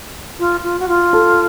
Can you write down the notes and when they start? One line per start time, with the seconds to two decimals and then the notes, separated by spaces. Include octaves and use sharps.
0.39 F4
0.63 F4
0.79 F#4
0.89 F4
1.13 A4